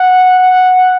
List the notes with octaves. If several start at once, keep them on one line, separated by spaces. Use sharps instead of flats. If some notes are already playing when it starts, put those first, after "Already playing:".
Already playing: F#5
F#5